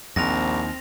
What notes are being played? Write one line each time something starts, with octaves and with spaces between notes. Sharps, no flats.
A#1 D#2 C4 A#6 F7